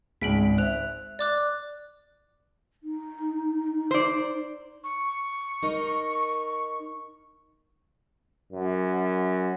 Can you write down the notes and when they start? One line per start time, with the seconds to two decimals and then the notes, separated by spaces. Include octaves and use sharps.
0.22 G#1 C#2 B6 D7 F#7
0.58 C5 E5 F#6 F7
1.19 D5 D6 F#6
2.83 D#4
3.91 C5 D5
4.83 C#6
5.63 D#4 A#4 D#5
8.53 F#2